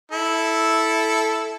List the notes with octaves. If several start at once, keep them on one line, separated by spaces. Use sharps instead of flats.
E4 A4